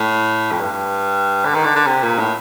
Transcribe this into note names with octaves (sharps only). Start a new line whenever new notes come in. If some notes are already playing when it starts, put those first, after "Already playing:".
Already playing: A2
F2
G2
D3
D#3
D3
D3
C3
A#2
A2